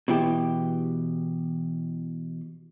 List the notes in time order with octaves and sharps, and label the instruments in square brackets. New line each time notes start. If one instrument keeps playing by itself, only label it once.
[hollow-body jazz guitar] B2 E3 G4